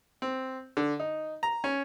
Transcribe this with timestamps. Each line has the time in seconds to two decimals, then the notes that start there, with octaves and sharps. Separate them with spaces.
0.22 C4
0.77 D3
0.99 D#4
1.43 A#5
1.64 C#4